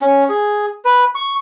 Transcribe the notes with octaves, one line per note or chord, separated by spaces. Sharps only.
C#4
G#4
B4
C#6